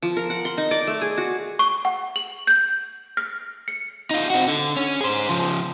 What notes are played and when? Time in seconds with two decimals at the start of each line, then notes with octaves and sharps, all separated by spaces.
0.02 F3
0.17 A#4
0.30 F#5
0.45 C6
0.58 D#4
0.71 D5
0.87 A3
1.01 G#4
1.18 F#4
1.59 C#6
1.85 F#5
2.16 F#7
2.47 G6
3.17 F6
3.68 C#7
4.11 D#4 F4
4.30 C4 F#4
4.48 D3
4.77 C#4
5.01 G#4 C5
5.29 C#3 F3